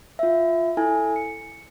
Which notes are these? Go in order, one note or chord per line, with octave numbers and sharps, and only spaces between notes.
F4 E5
E4 A4 G#5
C#7